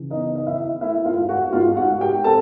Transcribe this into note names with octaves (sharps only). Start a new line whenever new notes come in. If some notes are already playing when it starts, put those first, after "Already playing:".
Already playing: C#3 E3
B3 D#4 D#5
D#5
D#3 E4 E5
A3 E4 E5
F4 F5
G#2
F#4 F#5
G#2 F4 F5
F#4 F#5
G#2
G4 G5
C4 A4 A5